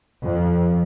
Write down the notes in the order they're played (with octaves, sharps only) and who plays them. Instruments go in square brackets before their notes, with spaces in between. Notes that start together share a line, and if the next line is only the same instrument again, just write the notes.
[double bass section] F2